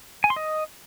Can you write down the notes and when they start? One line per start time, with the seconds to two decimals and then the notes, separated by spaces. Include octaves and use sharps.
0.24 G#5
0.30 C6
0.36 D#5